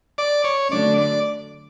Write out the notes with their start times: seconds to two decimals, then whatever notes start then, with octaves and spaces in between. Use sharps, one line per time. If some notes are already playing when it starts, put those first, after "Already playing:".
0.18 D5
0.44 C#5
0.71 D3 F#3 A3 D4 D5
0.98 D5